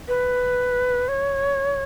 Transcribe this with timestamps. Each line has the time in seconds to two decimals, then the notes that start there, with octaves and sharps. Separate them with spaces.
0.08 B4
1.08 C#5